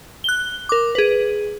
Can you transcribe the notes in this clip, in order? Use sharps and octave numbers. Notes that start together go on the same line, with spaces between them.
F#6 G7
A#4 D6
G#4 B4